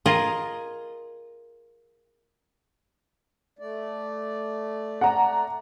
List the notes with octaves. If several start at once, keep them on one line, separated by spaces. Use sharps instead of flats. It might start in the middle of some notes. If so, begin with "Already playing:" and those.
F4 G#4 A#4 D#5
A3 D5
F#5 A#5